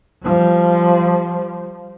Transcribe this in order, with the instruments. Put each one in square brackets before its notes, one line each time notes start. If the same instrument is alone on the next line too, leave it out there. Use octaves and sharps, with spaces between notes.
[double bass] F3 G3